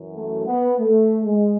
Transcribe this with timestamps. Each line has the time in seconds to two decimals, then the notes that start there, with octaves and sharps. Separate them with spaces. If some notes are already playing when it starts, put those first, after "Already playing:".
Already playing: F#2 E3
0.15 A3
0.47 B3
0.78 A3
1.25 G#3